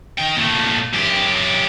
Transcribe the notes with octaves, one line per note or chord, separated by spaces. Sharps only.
D#3 G5
A#2 A3
F#2 G4